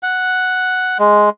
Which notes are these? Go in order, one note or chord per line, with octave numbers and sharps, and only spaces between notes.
F#5
G#3